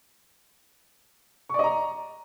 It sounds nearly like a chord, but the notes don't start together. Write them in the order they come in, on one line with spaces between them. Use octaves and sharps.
C#6 D5 D#5 A#5